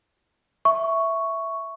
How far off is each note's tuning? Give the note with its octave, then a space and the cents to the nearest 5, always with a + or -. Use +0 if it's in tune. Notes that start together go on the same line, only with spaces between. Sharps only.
E5 +0 C#6 +5